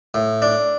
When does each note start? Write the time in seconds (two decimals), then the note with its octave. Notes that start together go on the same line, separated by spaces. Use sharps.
0.14 A2
0.42 D4